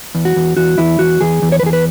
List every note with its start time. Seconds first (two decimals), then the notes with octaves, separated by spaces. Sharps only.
0.15 E2
0.25 F#4
0.36 E2
0.57 E2 F#4
0.78 E2 E4
0.99 E2 F#4
1.21 E2 G#4
1.42 E2
1.52 C#5
1.60 B4
1.63 E2 G#4
1.73 B4